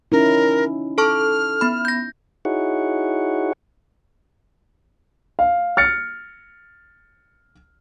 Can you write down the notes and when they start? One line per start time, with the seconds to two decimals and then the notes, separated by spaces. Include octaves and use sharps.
0.12 C#4 D#4 E4 A#4
0.98 A4 A5 C#6 F6
1.61 B3 B5
1.85 G6 A#6
2.45 D#4 E4 F#4 G#4 C#5 F#5
5.39 F5
5.77 F6 A6 C#7